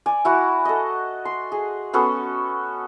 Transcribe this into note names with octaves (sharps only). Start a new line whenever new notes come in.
D5 G#5
E4 F#4 F#5
A4 D#5
C6
G#4
B3 C#4 F#4 A4